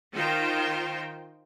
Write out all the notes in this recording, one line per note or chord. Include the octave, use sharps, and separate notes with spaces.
D#3 D#4 F4 C5 G5